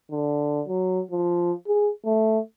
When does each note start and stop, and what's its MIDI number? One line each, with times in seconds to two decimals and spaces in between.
0.11 0.62 50
0.68 1.01 54
1.11 1.52 53
1.68 1.91 68
2.05 2.39 57